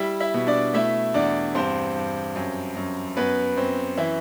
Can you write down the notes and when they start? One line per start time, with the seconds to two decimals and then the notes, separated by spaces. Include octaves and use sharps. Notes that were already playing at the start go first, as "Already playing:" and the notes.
Already playing: G3 E4 E5
0.20 E4 E5
0.34 B2
0.47 D4 D5
0.74 A3 E4 E5
1.14 E2 D4 D5
1.55 G2 C4 C5
1.96 G2
2.36 F#2
2.76 F#2
3.17 F#2 B3 B4
3.57 F#2 C4
3.98 E3 E4